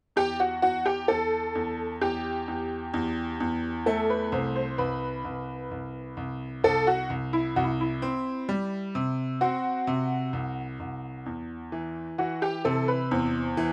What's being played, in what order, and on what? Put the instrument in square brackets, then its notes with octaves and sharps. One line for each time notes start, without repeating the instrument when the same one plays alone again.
[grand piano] E2 [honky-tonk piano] G4
[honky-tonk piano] F#4
[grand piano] E2 [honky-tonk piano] F#4
[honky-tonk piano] G4
[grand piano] E2 [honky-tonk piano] A4
[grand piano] E2
[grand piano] E2 [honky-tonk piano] G4
[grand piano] E2
E2
E2
[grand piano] A3 [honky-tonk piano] A4
[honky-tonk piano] B4
[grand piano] C2 [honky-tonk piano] C5
[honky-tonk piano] C5
[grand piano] C2 [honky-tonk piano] B4
[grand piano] C2
C2
C2
[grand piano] C2 [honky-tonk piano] A4
[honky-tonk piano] F#4
[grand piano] C2
[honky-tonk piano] E4
[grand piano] C2 [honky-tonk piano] F#4
[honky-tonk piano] E4
E4
[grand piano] C4
G3
C3
[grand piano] C4 [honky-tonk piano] F#4
[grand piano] C3
C2
C2
E2
E3
[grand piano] E3 [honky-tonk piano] F#4
[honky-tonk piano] G4
[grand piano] C3 [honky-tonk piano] A4
[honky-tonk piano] B4
[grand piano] E2 [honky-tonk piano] C5
[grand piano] E3